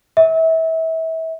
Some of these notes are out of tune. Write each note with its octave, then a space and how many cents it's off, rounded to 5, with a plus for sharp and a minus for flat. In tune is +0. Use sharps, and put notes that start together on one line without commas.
E5 -30